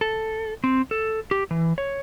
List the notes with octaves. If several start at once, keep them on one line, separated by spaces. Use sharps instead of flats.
A4
C4
A4
G4
E3
C#5